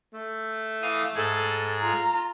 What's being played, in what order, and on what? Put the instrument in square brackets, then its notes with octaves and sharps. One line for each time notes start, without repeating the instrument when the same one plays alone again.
[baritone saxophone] A3
[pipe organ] E3 F5 D#6
[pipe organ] G#2 G#4 [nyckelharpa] A4
[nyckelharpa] F4 [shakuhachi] A#5